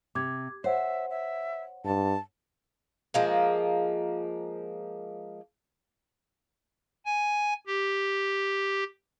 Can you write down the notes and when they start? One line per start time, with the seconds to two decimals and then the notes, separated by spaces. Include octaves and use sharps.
0.15 C3 D6 G#6
0.64 C5 C#5 E5 F#5
1.10 E5
1.85 G2 A5
3.14 F3 G#3 A#3
7.05 G#5
7.67 G4